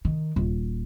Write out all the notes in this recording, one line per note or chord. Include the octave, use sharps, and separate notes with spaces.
D#3
D#1